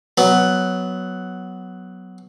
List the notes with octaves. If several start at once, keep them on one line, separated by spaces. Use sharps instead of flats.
F#3 B3